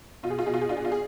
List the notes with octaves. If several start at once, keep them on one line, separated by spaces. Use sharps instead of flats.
B2 F4
G#4
F4
B2 G#4
F4
G#4
D4 F4
G#4
F4
G#4